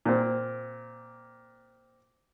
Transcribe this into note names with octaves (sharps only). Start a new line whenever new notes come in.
A#2 C4